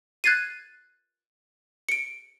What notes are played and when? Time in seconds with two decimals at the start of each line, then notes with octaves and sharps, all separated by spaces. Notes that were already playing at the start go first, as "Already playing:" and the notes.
0.24 F#6 G#6 A6 C7 D#7
1.89 C#7 D7